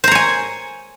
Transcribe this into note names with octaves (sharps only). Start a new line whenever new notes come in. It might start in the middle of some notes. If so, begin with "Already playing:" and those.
C5 C#5 G#5 A#5